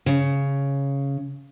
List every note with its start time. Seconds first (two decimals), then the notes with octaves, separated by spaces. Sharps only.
0.06 C#3